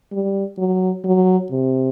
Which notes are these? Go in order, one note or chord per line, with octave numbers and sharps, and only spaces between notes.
G3
F#3
F#3
C3